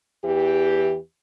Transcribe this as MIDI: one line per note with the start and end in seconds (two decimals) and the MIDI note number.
0.24 0.97 40
0.24 0.97 52
0.24 0.97 67